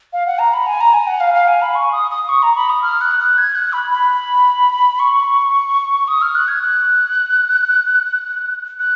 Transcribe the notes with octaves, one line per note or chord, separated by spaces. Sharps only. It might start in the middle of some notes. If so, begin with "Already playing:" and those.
F5
F#5
A#5
B5
G#5
A#5
G#5
F#5
F5
F5
G#5
B5
C#6
D#6
D#6
C#6
A#5
B5
D#6
F6
F#6
F#6
G#6
F#6
B5
B5
C#6
D#6
F6
F#6
G#6
F#6
F#6